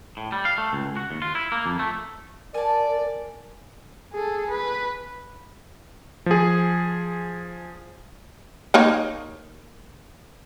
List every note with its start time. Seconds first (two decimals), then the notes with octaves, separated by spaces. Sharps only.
0.17 A2
0.32 G3
0.45 F5
0.58 A3
0.73 C#2
0.97 F#4
1.11 D#2
1.22 F4
1.35 E4
1.52 A#3
1.66 F2
1.79 A3
2.54 A#4 D5 G#5 A5
4.13 G#4 A4
4.51 B4
6.26 F3 G#4
8.74 A#3 D#4 C#5